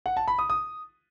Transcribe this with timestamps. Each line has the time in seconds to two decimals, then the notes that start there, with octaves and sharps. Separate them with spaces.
0.06 F#5
0.17 A5
0.28 B5
0.39 D#6
0.50 D#6